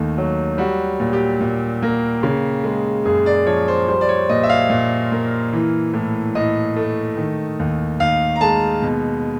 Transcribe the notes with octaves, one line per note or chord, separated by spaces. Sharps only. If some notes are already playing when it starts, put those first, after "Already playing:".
Already playing: D#2 D#3 A3
F#3
G3 F#4
A#2
G4
A#2
A#3
C#3
G#3
F#2 G#4
D5
F3 C#5
C5
G3 C5
D5
C#5
A#2 D#5
E5
F5
A#2
A#3
E3
A2
A2 D#5
A3
D#3
D#2
D#2 F5
A#5
G#3 A5
B2